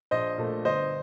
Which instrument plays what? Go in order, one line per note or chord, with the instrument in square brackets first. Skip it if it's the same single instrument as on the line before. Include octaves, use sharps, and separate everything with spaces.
[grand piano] A#1 C5 D#5
A#2 A3
G1 C5 D#5